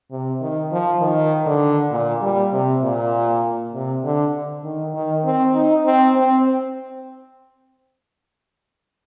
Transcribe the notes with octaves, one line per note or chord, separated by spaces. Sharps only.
C3
D#3
F3
D#3
D3
A#2
G3
C3
A#2
C3
D3
D#3
D#3
C4
D#4
C4
C4